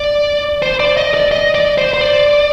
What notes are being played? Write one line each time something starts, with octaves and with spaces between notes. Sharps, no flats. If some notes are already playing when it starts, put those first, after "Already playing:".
Already playing: D5
C5
D5
D#5
D5
D#5
D5
C5
C5
D5